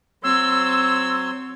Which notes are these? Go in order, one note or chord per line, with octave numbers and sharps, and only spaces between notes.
F#3 C4 C#5 C6 E6